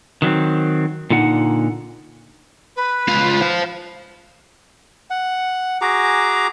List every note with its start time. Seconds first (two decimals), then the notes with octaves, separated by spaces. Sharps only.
0.22 D#3 F#3 B3 C4
1.10 A#2 D3 D#4 F#5
2.76 B4
3.09 C#2 F4
3.42 C5 F5
5.10 F#5
5.81 F#4 G#4 A#5 D6